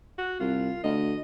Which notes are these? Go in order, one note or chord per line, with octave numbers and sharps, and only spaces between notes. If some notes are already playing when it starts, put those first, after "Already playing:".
F#4
C2 F4
D2 D#5